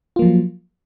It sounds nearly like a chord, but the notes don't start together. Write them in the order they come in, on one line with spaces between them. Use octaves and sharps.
F4 A#3 F3 F#3